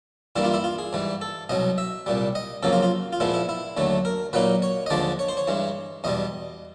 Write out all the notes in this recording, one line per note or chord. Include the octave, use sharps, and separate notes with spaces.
G2 E3 G3 A#3 E4
F4
E4
F4
G#4
G#2 E3 G3
A4
C2 B2 F#3 D#5
E5
C2 A#2 G3
D#5
F2 C#3 F#3 A#3 A4
F4
F4
F4
A#2 F3 G#3 B3 E4
E4
E4
D#2 D3 F#3 A3
A#4
A#2 F#3 A#3 D#4 B4
C#5
D#5
D#2 D3 F3 G#3 D5
C#5
C5
C#5
G2 E3 G#3
E2 B2 G3 D#5